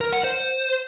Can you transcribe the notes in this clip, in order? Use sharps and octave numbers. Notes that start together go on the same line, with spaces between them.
A#4
F#5
C5